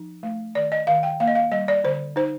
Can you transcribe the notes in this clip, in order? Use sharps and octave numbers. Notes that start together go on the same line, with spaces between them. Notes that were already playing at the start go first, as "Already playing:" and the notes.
Already playing: F3 D#4
A3
D#3 D5
D#5
D#3 F5
G5
A#3 F5
D#5
F5
G3 D#5
D5
D3 C5
D#4 C5